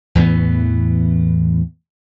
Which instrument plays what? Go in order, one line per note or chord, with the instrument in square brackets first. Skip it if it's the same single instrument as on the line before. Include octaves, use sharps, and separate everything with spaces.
[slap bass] E2 A2 E3 B3